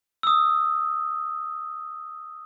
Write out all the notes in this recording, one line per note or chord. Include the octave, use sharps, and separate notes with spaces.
D#6 E6